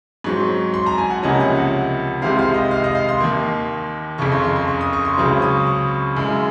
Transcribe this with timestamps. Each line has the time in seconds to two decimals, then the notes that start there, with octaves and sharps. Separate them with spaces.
0.24 G#2 F#3 C4 C#6
0.74 C6
0.86 A#5
0.98 G#5
1.10 F#5
1.23 C#2 C3 F3 A#3 C#4 D#5
1.40 F#5
1.56 F#5
2.22 C2 C3 D#3 G#3 C4 F5
2.39 F5
2.54 D#5
2.71 F5
2.84 D#5
2.95 F5
3.09 C6
3.20 D#2 D#3 A#3
4.18 F#1 F2 C#3 C#6
4.32 C6
4.43 C6
4.56 C6
4.68 C#6
4.81 D#6
4.93 C#6
5.05 C6
5.17 C#2 C#3 F#3 C4 C#6
5.42 D#6
5.67 C#6
6.16 F#2 C#3 G#3